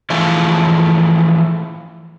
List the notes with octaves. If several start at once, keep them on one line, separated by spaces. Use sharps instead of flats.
E3 F3 A3 F4 G#4